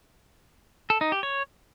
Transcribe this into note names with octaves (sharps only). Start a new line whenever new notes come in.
A4
D#4
G4
C#5